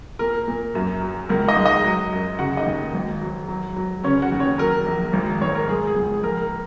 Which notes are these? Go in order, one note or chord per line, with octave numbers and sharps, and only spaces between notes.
A#2 A#4
A#2
F#2
F#3
C#2 A#4
D#4 D#5
G#3
D#4 D#5
F#3
F#2
C#3 F#4 F#5
D#4 D#5
D#2
G#1
F#3
F#3
F#3
C#3 C#4 C#5
F#4 F#5
D#2
C#4 C#5
F#3 A#4
A#1
G#1
G#2 C#5
A#4
G#3 G#4
G#4
C#2
G#4
A#1 A#4
A#4